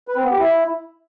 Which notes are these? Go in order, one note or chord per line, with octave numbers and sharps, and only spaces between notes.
B4
C4
B3
G4
E4